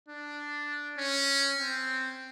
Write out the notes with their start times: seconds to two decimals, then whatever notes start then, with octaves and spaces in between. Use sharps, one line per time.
0.08 D4
0.98 C#4
1.59 C4